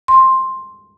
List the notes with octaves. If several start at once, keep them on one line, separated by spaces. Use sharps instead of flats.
C6